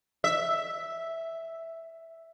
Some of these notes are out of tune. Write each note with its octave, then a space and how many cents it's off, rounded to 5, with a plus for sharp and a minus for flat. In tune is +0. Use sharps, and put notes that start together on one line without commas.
E5 -5